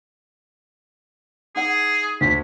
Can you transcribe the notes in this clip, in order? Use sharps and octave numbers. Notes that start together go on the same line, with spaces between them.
D#4 E4 G#4 F#5
D2 B6